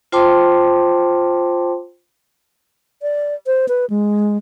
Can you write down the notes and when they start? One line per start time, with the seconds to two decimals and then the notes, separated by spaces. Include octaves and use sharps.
0.12 F4 C5 G5 A5 C6 D6
3.02 D5
3.47 C5
3.68 B4
3.90 G#3